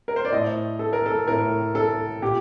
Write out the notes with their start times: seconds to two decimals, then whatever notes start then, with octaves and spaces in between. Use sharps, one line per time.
0.08 A#4
0.16 C5
0.25 D5
0.32 A2 D#5
0.79 A4
0.93 A#4
1.06 A4
1.27 A2 A#4
1.75 A4
2.22 A#2 G4